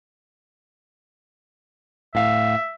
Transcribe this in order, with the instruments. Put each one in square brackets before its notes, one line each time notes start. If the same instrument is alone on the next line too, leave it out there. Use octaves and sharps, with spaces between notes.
[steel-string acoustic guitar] A2 F5 [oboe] E5